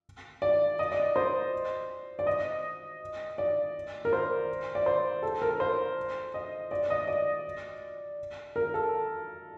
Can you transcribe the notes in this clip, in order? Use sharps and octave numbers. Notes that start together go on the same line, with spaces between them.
D5
D#5
D5
C5
D5
D#5
D5
A#4
C5
D5
C5
A4
A#4
C5
D#5
D5
D#5
D5
A#4
A4